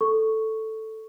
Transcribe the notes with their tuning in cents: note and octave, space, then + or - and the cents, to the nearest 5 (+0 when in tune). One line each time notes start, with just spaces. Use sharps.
A4 +0 C#6 +0